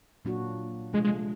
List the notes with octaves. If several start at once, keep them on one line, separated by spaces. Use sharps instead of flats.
A#2 F#3 A#3 D4 F#4
C3 F3 G#3 A3 D4 F4
G#3